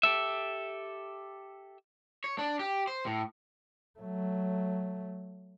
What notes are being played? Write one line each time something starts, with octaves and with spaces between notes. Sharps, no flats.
G4 A4 E5
C#5
D4
G4
C5
A2
F#3 A3